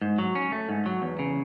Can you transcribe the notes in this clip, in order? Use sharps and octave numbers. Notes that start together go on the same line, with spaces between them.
G#2
F#3
C#4
A3
G#2
F#3
E2
C#3